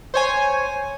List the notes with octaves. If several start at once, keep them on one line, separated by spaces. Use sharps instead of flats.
C5 C#5 G#5